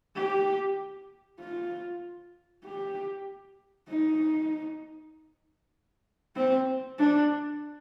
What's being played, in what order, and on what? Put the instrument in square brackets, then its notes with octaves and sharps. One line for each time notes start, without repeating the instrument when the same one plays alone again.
[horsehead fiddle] G4
F4
G4
D#4
C4
D4